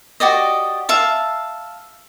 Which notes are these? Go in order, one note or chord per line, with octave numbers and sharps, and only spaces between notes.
F#4 G4 D5 D#5
E5 F5 A5